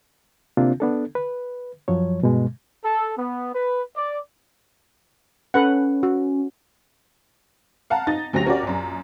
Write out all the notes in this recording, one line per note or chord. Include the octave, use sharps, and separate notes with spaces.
C3 A#3 C4 D4 F4
B3 D4 A4
B4
F#2 F3 F#3 C#5
G2 B2 G#3
A4
B3
B4
D5
C#4 A4 B4 F#5
F#4
F5 F#5 A5 A#5
D#4 A6
D2 F#3 C#4 G4 A#6 F7
C#4 F#4 G4 A#4 D5
A#1 F#2